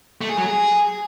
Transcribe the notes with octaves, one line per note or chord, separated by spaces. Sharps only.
A3
G#4
F#3
G#4